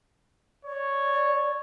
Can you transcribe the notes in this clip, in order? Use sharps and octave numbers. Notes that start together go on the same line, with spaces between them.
C#5 D5